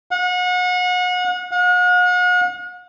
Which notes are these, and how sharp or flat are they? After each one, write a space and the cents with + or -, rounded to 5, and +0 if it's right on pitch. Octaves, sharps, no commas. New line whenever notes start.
F#5 -35
F#5 -45